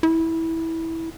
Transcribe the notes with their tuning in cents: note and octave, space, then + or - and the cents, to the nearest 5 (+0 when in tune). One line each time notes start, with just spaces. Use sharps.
E4 -15